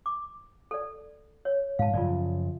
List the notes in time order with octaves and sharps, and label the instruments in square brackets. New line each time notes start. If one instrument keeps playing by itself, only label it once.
[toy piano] D6
A4 D5
C#5
[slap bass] G#2 [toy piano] F5 A5
[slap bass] F#2 C#3 F3 [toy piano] F4 D5